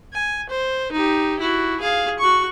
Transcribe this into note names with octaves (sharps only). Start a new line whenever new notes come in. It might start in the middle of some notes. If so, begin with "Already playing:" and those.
G#5
C5
D#4 G4
E4 F#4
G#4 F5
F#4 C#6